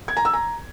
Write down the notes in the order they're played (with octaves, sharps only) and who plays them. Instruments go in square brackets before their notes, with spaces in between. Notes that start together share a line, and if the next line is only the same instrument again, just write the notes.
[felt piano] G#6
A#5
E6
A#5